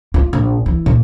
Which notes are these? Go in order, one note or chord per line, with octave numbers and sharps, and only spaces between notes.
F4
A#1
E3
A#2